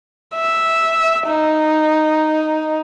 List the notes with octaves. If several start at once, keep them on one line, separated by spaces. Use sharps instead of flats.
E5
D#4